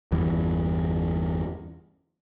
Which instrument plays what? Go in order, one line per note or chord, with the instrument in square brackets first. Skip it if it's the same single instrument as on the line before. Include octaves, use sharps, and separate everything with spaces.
[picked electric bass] G1 E2 G2 E3